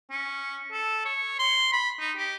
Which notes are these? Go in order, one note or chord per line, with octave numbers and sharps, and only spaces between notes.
C#4
A4
C#5
C6
B5
D#4
G4